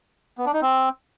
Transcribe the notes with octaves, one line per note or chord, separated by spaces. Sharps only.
B3
D4
D#4
C4